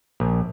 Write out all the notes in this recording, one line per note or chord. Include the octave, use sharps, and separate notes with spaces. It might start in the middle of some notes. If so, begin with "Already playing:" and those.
A#1